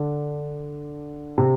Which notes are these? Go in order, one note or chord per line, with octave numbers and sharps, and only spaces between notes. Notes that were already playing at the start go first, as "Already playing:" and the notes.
Already playing: D3 D4
C3 C4